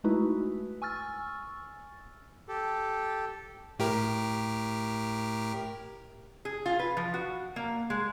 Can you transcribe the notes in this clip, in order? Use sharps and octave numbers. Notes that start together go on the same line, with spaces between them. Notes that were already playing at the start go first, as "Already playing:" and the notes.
G#3 A3 D#4 E4 F#4 B4
G#5 C#6 E6 F6 A6
G4 A4
A2 G4 A#4
G#4
F4
B4
F3
F#4
A#3
G#3